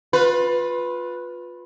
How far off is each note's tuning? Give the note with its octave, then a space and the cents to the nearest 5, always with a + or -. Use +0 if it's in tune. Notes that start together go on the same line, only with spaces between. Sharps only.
F4 +25 B4 +0